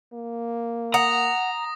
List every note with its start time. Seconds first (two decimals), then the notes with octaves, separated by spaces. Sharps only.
0.14 A#3
0.94 F#5 A#5 D#6 A#6